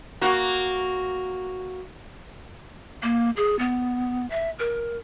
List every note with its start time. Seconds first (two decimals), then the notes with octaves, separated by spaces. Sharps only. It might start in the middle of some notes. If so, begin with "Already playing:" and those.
0.21 A#3 F#4
3.03 A#3
3.36 G#4
3.59 B3
4.30 E5
4.59 A#4